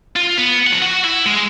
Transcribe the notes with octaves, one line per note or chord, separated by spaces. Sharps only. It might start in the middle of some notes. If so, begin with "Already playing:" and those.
F4
B3
F3 F#5
F#4
E4
G#3